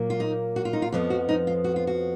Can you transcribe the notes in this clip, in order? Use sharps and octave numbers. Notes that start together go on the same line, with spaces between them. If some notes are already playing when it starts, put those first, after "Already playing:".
Already playing: A#2 F#3 A#3
F4
D#4
F#4
F4
D#4
F4
F2 F3 B3 F4
F#4
D#4
F4
F#4
F4
F#4